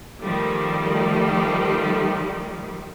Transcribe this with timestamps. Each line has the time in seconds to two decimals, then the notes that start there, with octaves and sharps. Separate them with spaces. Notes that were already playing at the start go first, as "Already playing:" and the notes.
0.21 D#3 F3 G3 A3